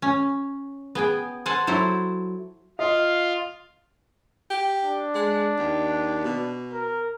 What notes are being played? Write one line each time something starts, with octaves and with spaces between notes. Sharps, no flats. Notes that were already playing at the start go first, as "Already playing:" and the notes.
C#4
B3 G#4 G5
C5 F#5 G#5 A5
F#3 E4 A4 C5
F4 D#5 F5
G4
D4
G#3
D#2
B2
A#4